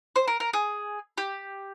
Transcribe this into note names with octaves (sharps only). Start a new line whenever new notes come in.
C5
A#4
A#4
G#4
G4